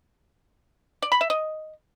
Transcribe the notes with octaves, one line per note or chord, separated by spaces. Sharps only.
D5
B5
E5
D#5